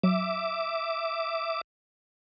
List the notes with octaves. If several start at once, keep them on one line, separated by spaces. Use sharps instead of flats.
F#3 E5 D6